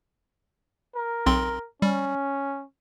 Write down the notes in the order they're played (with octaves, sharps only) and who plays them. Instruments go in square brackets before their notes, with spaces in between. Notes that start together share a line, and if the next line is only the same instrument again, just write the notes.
[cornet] A#4
[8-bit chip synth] B1 C4 C6
[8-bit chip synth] G3 [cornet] C#4